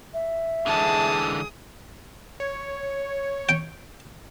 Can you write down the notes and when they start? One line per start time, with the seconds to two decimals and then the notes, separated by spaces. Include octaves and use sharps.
0.14 E5
0.67 D3 E3 G#3 G#4 A5 D#6
2.40 C#5
3.49 G5